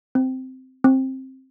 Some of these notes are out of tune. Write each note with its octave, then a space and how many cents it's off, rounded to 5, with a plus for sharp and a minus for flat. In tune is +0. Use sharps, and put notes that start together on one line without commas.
C4 -10
C4 +15